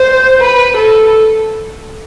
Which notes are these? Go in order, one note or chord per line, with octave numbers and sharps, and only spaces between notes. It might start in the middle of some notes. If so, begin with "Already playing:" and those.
Already playing: C5
B4
A4